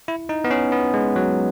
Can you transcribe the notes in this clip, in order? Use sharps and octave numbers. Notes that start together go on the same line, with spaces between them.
E4
D#4
B3
C#4
B3
G#3
F#3